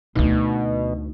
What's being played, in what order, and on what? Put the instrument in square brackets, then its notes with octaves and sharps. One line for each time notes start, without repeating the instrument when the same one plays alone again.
[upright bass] D2 D#4 [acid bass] B2